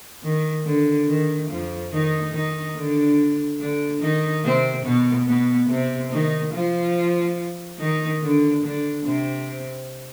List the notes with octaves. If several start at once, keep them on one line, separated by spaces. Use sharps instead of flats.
D#3
D3
D#3
F2 F3
D#3 D#4
D#3 D#4
D3 D4
D3 D4
D#3 D#4
C3 C4
B2 B3
B2 B3
C3 C4
D#3 D#4
F3 F4
D#3 D#4
D3 D4
D3 D4
C3 C4